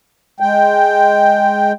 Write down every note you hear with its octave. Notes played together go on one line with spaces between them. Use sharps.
G#3 G5